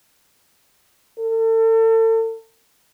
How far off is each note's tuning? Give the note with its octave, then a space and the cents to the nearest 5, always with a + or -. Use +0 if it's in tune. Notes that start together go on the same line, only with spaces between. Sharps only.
A4 +40